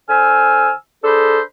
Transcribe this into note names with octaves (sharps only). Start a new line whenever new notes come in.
D3 C5 G#5 E6 F6
D4 G#4 A4 B4 C5